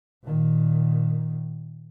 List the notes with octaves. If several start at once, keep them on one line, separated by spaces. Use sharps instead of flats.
A#2 D#3